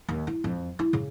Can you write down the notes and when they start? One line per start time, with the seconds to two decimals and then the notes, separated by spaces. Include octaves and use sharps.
0.09 D#2
0.27 E4
0.44 F2
0.79 E4
0.93 C#3